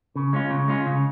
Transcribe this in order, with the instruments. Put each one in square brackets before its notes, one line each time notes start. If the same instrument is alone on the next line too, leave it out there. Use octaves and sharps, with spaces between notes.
[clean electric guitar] C#3
G#3 C#4 F4
C#3
G#3 C#4 F4
C#3